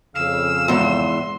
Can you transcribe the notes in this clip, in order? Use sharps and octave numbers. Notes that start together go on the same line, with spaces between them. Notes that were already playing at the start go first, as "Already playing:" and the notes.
F2 C#3 F5 E6
E2 G#2 C6